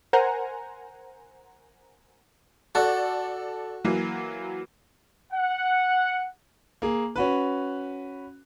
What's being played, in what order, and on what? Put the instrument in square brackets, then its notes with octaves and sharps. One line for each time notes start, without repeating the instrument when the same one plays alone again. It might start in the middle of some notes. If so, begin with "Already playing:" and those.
[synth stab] A#4 C5 F#5 G#5 A#5
[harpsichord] F#4 [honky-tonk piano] A4 D5
[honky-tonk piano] E3 F#3 A#3
[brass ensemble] F#5
[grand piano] A#3 G#4
C#4 F#4 B4